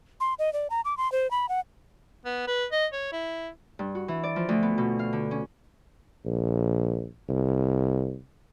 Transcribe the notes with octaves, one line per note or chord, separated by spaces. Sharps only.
C6
D#5
D5
A#5
D6
C6
C5
B5
F#5
B3
B4
D#5
C#5
E4
G2
F#4
E3
D5
F3
D2
B3
B2
F5
D3
C#4
A#1
C2